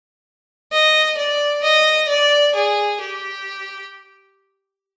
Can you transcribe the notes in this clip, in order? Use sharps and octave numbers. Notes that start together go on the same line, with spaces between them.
D#5
D5
D#5
D5
G#4
G4